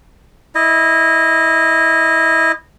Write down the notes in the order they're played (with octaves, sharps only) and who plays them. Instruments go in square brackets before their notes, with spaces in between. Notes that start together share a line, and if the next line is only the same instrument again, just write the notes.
[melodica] E4 D#5